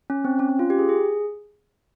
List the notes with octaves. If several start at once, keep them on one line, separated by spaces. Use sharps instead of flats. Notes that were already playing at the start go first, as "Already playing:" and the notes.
C#4
C4
C#4
C#4
F4
G4
G#4
G#4